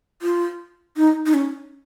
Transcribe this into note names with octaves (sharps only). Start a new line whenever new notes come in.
F4
D#4
D#4
C#4